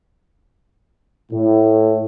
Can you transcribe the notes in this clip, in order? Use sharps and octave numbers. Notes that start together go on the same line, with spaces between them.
A2